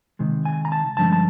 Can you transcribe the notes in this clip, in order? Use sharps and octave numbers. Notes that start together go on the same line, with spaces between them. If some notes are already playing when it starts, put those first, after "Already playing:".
C3 D#3 G#3
G#5
A#5
A5
G2 D3 F3 G#3 C#4 A5
A5